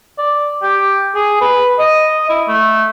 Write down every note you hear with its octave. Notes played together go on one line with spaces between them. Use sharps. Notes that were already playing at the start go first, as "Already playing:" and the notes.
D5
G4
G#4
B4
D#5
E4
A3